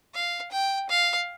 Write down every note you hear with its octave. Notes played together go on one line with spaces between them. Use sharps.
F5
G5
F5